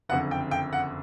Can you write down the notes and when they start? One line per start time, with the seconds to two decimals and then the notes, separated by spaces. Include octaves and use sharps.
0.09 F#1 F2 D3 F#5
0.31 G5
0.51 G5
0.73 F#5